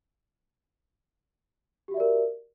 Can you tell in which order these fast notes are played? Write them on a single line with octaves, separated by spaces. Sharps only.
G4 F#4 E5 D5 A#4